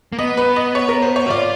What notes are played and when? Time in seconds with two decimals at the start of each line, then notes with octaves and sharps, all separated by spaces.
0.12 A#3
0.19 B3 D#5
0.37 B4
0.56 D#5
0.75 C#5
0.89 A#4
1.02 C5
1.16 C#5
1.26 F#4
1.30 F4 D5